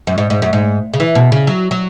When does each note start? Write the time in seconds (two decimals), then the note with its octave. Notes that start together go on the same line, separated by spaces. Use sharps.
0.07 F#2
0.18 G#2
0.30 G#2
0.42 F#2
0.53 G#2
0.94 C#3
1.00 E3
1.15 B2
1.32 C#3
1.47 F#3
1.71 F#3